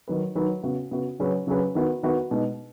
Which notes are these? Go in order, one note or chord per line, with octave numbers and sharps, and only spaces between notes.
D#3 F#3 D#4 B4
D#3 F#3 D#4 B4
C#3 B3 F#4
C#3 B3 F#4
C#3 F#3 C#4 G#4 B4
C#3 F#3 C#4 G#4 B4
D#3 B3 F#4 B4
D#3 B3 F#4 B4
B2 G#3 D#4